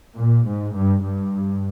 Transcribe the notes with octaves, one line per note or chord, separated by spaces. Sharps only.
A#2
G#2
G2
G2